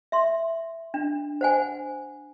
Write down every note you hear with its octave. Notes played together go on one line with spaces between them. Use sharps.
E5 C6
D4
C5 F#5 G#5